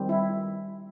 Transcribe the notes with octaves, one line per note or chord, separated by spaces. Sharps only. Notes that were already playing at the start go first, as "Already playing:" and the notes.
Already playing: D#3 G3 C4
E4